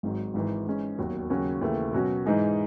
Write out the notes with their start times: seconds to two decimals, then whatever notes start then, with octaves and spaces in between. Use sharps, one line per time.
0.03 G#1 G#2 F#3
0.34 G#1 G#2 E3
0.67 G#2 E3 G#3 C#4
0.98 E1 D#2 D#3 F#3
1.30 D#2 C#3 F#3 C#4
1.61 D#2 C#3 E3 A3
1.93 B2 F#3 C#4 F#4
2.26 G#2 E3 G#3 D#4 G#4